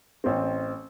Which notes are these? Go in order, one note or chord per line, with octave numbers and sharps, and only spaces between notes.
A1 C4